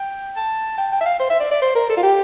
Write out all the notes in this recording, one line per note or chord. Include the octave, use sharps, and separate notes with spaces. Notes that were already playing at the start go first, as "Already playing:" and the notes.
Already playing: G5
A5
G5
G5
E5
F5
C5
E5
D5
D5
C5
A#4
A4
F4
G4